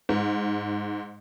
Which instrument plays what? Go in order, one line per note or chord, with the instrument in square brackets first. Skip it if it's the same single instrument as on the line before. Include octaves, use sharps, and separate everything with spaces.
[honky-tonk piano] G#2